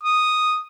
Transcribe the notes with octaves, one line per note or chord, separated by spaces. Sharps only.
D#6